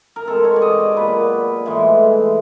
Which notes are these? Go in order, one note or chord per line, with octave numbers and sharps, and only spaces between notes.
A#4
B2 G#3 C4 A4
C#5
D5
D#5
D5
A#2 F#3 B3 B4
A2 E3 G#3